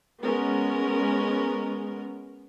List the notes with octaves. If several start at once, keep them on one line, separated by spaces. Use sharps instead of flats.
G#3 B3 C#4 A#4